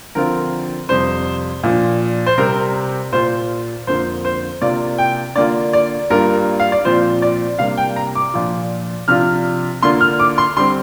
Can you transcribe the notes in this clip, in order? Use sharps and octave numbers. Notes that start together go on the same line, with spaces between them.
D3 F3 C4 F4 A#4
F2 C3 G3 C5
A#2 F3 D4
C5
C3 G3 C4 A#4
A#2 A#3 F4 C5
F2 D3 A#3 F4 C5
C5
C3 A#3 D4 F4 D5
G5
D3 A#3 F4 D5
D5
G2 G3 A#3 F4 A#4
F5
D5
A#2 F3 C4 F4 C5
D5
C3 G3 A#3 D4 F5
G5
A#5
D6
A#2 F3 D4 F4
C3 F3 D4 F4 F6
D3 A#3 D4 F4 C6
F6
D6
C6
D3 G3 C4 C6